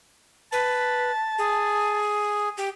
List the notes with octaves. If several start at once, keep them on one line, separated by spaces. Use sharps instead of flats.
B4 A5
G#4
G4